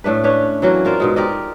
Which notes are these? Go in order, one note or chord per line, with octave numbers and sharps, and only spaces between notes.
A2 A3 D4 B4
C#4 D4 B4 C#5
E3 F#3 A#3 F#4
F4 A#4 C5 D5
G#2 B2 G#3
G4 A#4 D5 D#5